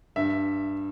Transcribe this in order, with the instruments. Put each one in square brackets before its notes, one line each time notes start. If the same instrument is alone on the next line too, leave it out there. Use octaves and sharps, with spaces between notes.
[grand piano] G2 E5